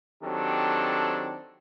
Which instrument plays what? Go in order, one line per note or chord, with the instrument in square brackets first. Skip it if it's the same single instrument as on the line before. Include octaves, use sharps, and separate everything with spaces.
[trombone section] D#3 F#3 C4 D4 G4 A4